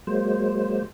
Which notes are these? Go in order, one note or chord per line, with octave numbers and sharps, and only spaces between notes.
F#3 G#3 A#3 C5